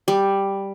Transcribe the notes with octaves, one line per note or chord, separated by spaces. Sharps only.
G3